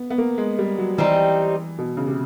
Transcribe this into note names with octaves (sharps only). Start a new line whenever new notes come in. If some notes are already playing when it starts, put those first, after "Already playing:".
Already playing: B3
B3
A#3
G#3
G3
F#3
E3 G3 C4 D#4
B2
C#3
C3